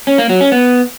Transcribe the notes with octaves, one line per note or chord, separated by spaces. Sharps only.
C#4
A#3
F#3
C#4
B3